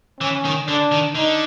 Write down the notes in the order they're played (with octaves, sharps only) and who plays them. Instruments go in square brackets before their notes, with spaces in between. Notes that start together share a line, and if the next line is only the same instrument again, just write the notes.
[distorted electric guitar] E3 [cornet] C#4
[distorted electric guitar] D#3
[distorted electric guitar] D3 [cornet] D4
[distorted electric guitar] D#3
[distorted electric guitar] D3 [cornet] D#4